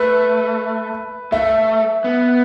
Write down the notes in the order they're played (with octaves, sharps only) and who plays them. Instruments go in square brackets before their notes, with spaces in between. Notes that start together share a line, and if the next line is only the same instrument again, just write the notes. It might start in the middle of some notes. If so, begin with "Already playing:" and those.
Already playing: [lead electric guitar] A3 [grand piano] B4
[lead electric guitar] A3 [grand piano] E5
[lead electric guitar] B3